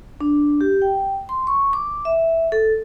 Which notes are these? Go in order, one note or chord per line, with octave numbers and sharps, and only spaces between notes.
D4
G4
G5
C6
C#6
D6
E5
A4